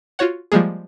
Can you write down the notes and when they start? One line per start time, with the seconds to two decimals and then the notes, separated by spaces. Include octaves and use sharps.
0.19 F4 F#4 C#5 F#5
0.52 F3 G3 G#3 A#3 G#4